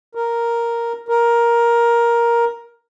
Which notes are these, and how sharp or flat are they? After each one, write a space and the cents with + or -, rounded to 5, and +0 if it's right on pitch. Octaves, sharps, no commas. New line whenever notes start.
A#4 +0
A#4 +10